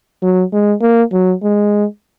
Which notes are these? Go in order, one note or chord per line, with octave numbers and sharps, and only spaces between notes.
F#3
G#3
A#3
F#3
G#3